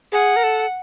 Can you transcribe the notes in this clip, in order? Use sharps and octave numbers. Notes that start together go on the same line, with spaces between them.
G#4 F#5
A#4
A4